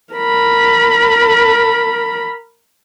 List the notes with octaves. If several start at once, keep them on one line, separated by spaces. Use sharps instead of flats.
A#4 B5